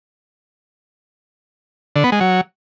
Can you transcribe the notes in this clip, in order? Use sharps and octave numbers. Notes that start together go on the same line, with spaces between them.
D3
B3
G#3
F#3